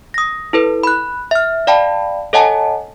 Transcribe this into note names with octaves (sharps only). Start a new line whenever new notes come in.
D#6 A#6
E4 A4 B4
B5 F#6
E5 F6
D5 F5 G5 A5 B5
A4 C#5 D#5 F#5 G#5 A5